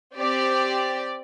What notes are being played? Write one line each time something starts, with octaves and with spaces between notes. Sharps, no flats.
C4 G4 D5